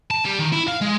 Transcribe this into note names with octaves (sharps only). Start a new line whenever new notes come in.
A5
G3
D#3
E4
F5
G#3